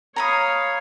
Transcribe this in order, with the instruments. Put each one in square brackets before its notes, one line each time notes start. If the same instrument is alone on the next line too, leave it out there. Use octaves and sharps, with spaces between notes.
[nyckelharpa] C#5 F5 [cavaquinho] A#5 B5 D#6